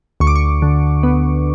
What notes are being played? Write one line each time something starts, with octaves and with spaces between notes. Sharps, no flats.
D2 C#6
D6
C#6
D3
B3